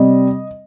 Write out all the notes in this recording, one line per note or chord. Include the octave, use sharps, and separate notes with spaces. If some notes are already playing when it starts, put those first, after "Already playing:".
Already playing: C3 G3 C4 D#5